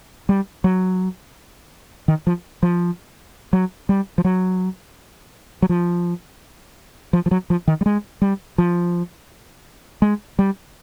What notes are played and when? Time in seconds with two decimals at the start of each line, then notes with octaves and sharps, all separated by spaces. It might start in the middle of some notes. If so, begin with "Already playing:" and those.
0.29 G3
0.64 F#3
2.08 D#3
2.27 F3
2.63 F3
3.53 F#3
3.89 G3
4.18 F3
4.25 F#3
5.62 F#3
5.69 F3
7.13 F3
7.26 F3
7.31 F#3
7.50 F3
7.68 D#3
7.81 G3
7.86 G#3
8.22 G3
8.58 F3
10.02 G#3
10.39 G3